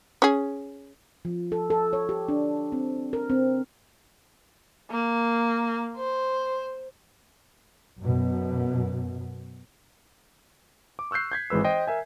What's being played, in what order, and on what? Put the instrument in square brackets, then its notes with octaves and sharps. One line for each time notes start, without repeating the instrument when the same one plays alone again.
[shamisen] C#4 G#4
[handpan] F3
A4
A4
C#5
G4
D4
C4
A#4
C4
[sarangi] A#3
C5
[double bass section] F#2 B2
[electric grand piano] D6
C#6 E6 F#6 G6 C7
G6 G#6 B6
G#1 E3 G#3 B4 E6
C5 D#5 G5
A#4 E5 G#5